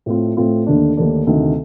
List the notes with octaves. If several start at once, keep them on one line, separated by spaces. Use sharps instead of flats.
A2 A3 C4 F4
A2 A3 C4 F4
D#2 D3 A3 D4
D#2 D3 A3 D4
D2 C3 D#3